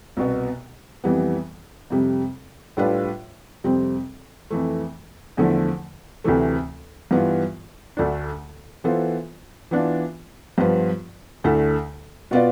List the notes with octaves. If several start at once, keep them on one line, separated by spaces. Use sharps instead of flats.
C2 B2 B3
F2 E3 G3 B3
F2 C3 G3
A2 G3 D4 F4 B4
F2 C3 G3 C4
F2 E3 A3
E2 D3 F3 A3 E4
D2 C3 E3 A3
G2 E3 B3 F4
D2 D3 A3 D4
E3 B3 F4 A4 C5
E3 B3 D4 F4
G2 F3 B3 F4 B4
D2 D3 A3 E4 A4
B2 B3 F4 B4 D5